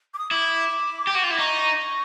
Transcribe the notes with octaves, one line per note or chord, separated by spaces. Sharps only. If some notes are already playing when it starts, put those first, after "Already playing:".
D6
D#6
E4 D6
G4
F#4
F4
E4
D#4 C#6